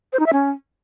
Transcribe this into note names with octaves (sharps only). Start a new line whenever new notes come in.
C5
D#4
E5
C#4